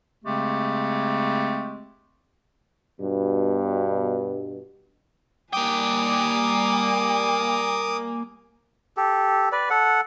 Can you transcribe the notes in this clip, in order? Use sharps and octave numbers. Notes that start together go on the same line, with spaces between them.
C#3 G#3 A3 C4 G4
G2 B2
G3 A#3 G5 G#5 D6 D#6
G4 A4
B4 D5
A4 F#5